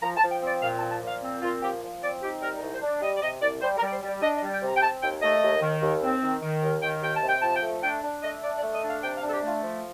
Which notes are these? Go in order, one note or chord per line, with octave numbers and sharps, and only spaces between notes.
F3 A#5
A5
F3
G5
C4 D5
A#2 F5
A5
F3
A5
A#2
F5
C4
A#2 F4
F3 G4
F3
C4 D5
D#4 G4
G3 A#4
A#4
C2
C5
D4
D5
G3 D#5
D5
C3 D#5
C2 D5
G3 C5
A#4
G3
D5
C5
G3 D5
D4 D#5
D#5
G3
G5
C3
A#5
G5
C4 A5
D#2 G5
A3 D#5
D#2
D#3
D#2
C4
D#3
D#3
D#2
D#3 G5
D#2 G5
A5
C3
G5
F3 A5
G5
A3
D4 G5
D4
A3 D#5
D4 D5
D5
A3
D#5
D4
F5
C3 G5
F5
D4 A4
G4
A3
F4
F3